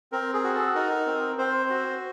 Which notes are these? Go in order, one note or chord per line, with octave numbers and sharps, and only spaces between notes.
C4 A#4
G#4
F#4
A4
D#4 A#4
C4
C4 C5
F#4